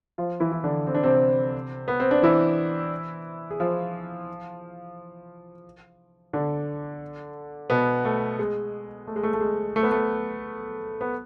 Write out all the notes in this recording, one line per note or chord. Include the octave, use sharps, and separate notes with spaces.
F3 F4
E3 E4
E4
D3 D4
C4
D4
C3 C4
B3
C4
D4
E3 E4
G#4
F3 F4
D3 D4
B2 B3
A3
G#3
A3
G#3
A3
A3
G#3
A3
B3
A3
B3